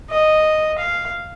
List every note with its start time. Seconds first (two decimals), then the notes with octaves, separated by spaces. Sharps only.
0.10 D#5
0.78 F5